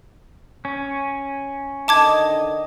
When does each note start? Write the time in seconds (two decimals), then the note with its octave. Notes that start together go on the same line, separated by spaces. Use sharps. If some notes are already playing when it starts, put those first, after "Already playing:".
0.65 C#4
1.88 D3 D#3 D#5 A5 D6 G#6